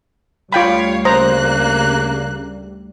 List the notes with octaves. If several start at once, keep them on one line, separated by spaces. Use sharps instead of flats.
D2 G3 F4 C#5 F5 G5 B5
C#3 A#3 C5 A#5 F#6